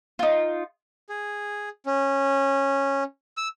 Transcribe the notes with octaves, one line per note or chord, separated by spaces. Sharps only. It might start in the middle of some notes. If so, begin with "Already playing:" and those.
D#4 F4
G#4
C#4
E6